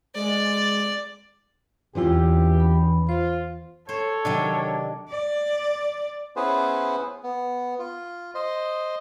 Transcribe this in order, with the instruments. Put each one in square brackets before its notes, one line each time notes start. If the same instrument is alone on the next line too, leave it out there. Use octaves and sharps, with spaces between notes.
[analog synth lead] G#3 [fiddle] D5
[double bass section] E2 [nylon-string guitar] E3 C#4 F4 [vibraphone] C4 E4 [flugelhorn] G4
[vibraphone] B5
[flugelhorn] F4 [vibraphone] C5
[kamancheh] A4 [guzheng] C5 [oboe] C#5
[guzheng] C3 D#3 F#3 [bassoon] D4
[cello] D5
[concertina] B3 C#4 E4 G#4 B4 C5
B3
F4
C5 D#5 C6